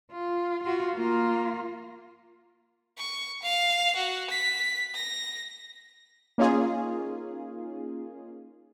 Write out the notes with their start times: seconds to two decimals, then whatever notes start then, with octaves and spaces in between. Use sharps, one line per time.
0.12 F4
0.63 F4 F#4
0.95 A#3 F4
2.98 C#6
3.43 F5
3.96 F#4
4.30 B6
4.94 A#6
6.38 A#3 C#4 D#4 F4 G#4